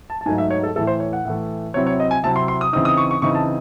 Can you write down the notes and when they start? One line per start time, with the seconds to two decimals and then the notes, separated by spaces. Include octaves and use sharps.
0.10 A5
0.21 A5
0.26 G#2 F#3 A3 D#4 G#5
0.38 E5
0.50 C#5
0.63 A4
0.76 A2 E3 A3 A4
0.87 C5
1.00 C#5
1.13 F#5
1.25 A2 E3 A3
1.74 C3 F#3 C4 E4 C#5
1.87 C#5
2.00 D#5
2.11 G#5
2.23 C3 F#3 C4 E4 A5
2.36 C6
2.48 C6
2.61 D#6
2.73 C#3 E3 C4 D#4 D#6
2.85 D#6
2.97 C#6
3.11 C#6
3.22 C#3 E3 C4 D#4 C#6
3.35 A5